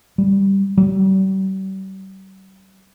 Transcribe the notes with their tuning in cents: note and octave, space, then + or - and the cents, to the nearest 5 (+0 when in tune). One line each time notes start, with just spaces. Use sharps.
G3 +0
G3 -40